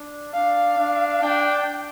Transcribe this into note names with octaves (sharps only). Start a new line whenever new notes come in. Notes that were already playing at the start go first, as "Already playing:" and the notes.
Already playing: D4
D4 F5
D4
D4 G5